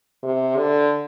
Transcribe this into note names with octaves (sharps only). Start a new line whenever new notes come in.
C3
D3